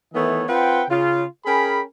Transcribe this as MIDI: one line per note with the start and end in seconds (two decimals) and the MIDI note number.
0.14 0.44 51
0.14 0.44 52
0.14 0.44 57
0.14 0.44 59
0.14 0.44 73
0.14 0.44 75
0.48 0.83 60
0.48 0.83 65
0.48 0.83 71
0.48 0.83 78
0.48 0.83 79
0.90 1.24 49
0.90 1.24 65
1.46 1.81 61
1.46 1.81 68
1.46 1.81 70
1.46 1.81 79
1.46 1.81 83